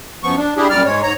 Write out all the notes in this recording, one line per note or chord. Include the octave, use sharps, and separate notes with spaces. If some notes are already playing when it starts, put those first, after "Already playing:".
F#2 F3 B3 C#6
D4
D4 E4 G4 G#4
F#2 A#2 G3 D5 F6
G#2 G#3 C#5
G#2 C#5 A#5